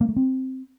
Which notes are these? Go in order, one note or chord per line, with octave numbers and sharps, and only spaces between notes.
A#3
A3
C4